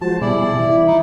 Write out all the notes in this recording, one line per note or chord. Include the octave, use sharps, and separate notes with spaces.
F3 G#3 F#4 C5 A5
B2 G3 E4 G#4 D5
E3 E5
D#4 E4